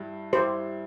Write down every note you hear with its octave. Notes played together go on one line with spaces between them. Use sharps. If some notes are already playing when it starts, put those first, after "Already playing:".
Already playing: G2 G3 E4
G2 G3 E4 G4 C5